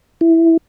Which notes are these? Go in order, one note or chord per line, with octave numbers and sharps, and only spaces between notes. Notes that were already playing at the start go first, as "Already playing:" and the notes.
E4